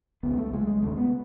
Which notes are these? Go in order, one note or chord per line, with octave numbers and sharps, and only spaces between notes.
C#2 C#3 B3
A3
C#2 C#3 G#3
G#3
D#2 C#3 A3
B3